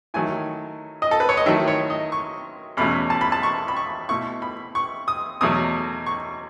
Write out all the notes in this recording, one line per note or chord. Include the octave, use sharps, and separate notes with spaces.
D#3 F#3 A3 E4 G#5
D#5
A4
B4
C#5
D#5
D#3 F#3 A3 E4 E5
C#5
D#5
C#6
E2 B2 A3 C#4 B5
A5
B5
A5
C#6
B5
C#6
B2 A3 E4 C#6
B5
C#6
D#6
E2 B2 F#3 A3 D#6
C#6